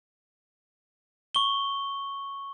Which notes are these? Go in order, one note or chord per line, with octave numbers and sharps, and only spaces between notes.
C#6 G7